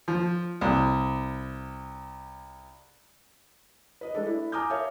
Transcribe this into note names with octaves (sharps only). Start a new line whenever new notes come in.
F3
C2
B4 D#5
G#3 A3 D4 A4 D5
E4
G#5 A#5 D6 D#6 F6 G6
A#4 C#5 E5 F5 A5